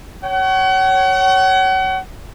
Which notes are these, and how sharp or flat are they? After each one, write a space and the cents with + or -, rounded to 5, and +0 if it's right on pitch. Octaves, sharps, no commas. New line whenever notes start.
C#5 +0 F#5 +40